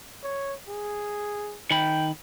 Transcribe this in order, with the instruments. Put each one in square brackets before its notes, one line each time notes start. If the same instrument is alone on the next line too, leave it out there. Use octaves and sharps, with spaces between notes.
[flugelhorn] C#5
G#4
[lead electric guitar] D#3 B5 [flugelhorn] G5